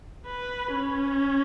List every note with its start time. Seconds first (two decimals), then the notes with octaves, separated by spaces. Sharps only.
0.26 B4
0.73 C#4